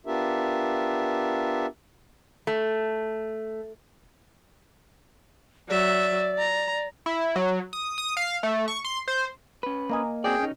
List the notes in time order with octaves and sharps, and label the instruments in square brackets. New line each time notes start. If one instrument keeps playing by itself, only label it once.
[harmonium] B3 D4 F4 G4 A#4 E5
[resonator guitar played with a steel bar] A3
[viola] F#3 E5 [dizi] D5
[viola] A#5
[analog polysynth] E4
F#3
D#6
D#6
F5
A3
C#6
C6
C5
[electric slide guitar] C#4 B4
[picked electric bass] A#3 [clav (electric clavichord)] A#4 D#5 G#5
[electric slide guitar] C4 F#4 D5 [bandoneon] G#4 G5
[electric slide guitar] C#4 D#4